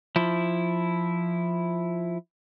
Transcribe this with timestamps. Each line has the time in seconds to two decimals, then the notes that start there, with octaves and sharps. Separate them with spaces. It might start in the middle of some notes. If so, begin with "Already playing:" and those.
0.16 F3 E4